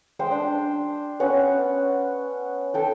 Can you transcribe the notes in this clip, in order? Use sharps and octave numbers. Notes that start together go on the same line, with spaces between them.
G#3 C5 G5
D4
B3 C#4 F#5
A4 G5 A5